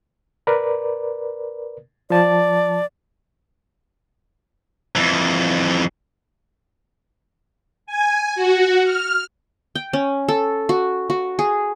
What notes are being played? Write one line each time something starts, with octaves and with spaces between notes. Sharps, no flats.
A#4 B4 D5
F3 D5 A5
F2 E3
G#5
F#4
F6
G5
C#4
A4
F#4
F#4
G#4